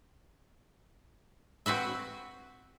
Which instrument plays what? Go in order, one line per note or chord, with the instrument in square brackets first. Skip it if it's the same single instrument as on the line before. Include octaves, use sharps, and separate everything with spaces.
[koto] C4 F#4 B4 E5